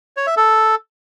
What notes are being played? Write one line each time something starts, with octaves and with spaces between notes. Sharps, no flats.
C#5
E5
A4